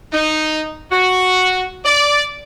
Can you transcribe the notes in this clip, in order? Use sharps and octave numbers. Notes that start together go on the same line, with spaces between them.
D#4
F#4
D5